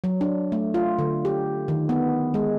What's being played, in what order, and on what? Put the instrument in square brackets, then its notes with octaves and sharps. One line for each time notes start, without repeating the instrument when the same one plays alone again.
[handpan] F#3
D4
A3
F4
D3
G4
D#3
B3
G#3